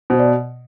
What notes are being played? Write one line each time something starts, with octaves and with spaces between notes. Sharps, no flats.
B2 C5
D5